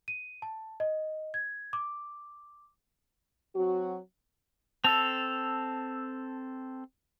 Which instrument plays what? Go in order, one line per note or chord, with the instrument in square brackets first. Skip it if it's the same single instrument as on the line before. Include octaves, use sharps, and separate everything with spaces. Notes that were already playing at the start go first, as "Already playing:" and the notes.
[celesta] D#7
A5
D#5
G#6
D6
[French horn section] F#3 C4 F#4
[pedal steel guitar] C4 A4 [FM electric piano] A5 E6 [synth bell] F7